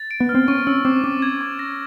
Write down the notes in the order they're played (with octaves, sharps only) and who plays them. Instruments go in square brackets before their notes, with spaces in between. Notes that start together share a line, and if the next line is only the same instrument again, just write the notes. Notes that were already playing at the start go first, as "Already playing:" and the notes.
Already playing: [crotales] A6
D7
[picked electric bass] B3
[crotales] F6
[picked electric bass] C4
[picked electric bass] C#4 [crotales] C#6
[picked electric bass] C#4 [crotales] E6
[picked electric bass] C4 [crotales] D6
[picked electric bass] C#4 [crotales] D6
[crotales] G#6
C#6
A#6